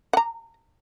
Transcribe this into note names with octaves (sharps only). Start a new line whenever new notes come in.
F#5 A#5